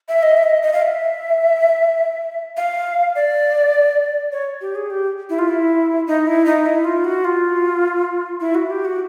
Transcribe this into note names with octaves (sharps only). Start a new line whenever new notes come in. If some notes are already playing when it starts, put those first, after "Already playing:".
E5
D#5
E5
D#5
D#5
F5
E5
F5
D5
C#5
G4
G#4
G4
E4
F4
E4
D#4
E4
D#4
E4
F4
F#4
F4
E4
F#4
G4
F#4